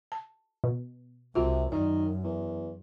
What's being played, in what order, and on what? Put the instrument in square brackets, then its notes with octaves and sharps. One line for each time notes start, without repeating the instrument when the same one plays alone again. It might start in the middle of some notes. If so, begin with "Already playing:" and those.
[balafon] A5
[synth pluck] B2
[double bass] C2 [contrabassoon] C3 [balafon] F4 F#4
[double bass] F#2 [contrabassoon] D#3 [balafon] D5
[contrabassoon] E2